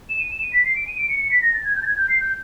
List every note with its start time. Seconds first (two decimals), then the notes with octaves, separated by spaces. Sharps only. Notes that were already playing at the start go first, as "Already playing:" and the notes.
0.09 E7
0.20 D#7
0.31 E7
0.42 D#7
0.53 B6
0.65 C7
0.75 D7
0.87 D#7
0.98 D7
1.09 C#7
1.20 C#7
1.31 B6
1.42 A#6
1.54 A6
1.65 G#6
1.76 G6
1.83 A6
1.86 G#6
1.97 G6
2.09 C7
2.20 G6